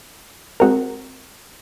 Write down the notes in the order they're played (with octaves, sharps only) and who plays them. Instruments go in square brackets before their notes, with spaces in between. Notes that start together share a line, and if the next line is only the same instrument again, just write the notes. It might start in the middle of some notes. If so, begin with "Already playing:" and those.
[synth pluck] G#3 C4 F#4 A#4